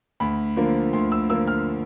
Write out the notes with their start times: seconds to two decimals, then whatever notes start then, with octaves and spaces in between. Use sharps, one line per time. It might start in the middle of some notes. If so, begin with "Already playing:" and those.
0.20 D2 B5
0.57 D3 F3 A#3
0.93 D2 C6
1.12 E6
1.30 D3 F3 A#3 E6
1.48 F6